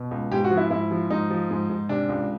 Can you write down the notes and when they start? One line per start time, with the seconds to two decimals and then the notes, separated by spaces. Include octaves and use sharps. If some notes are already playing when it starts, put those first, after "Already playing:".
Already playing: B2
0.11 C#2
0.32 G#2 G4
0.44 F#4
0.51 F3
0.57 E4
0.70 G#2 E4
0.91 F3
1.10 G#2 D#4
1.30 F3
1.51 G#2
1.69 G#2
1.89 C3 D4
2.09 C#2